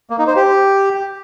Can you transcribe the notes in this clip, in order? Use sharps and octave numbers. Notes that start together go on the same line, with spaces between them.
A#3
D#4
C5
G4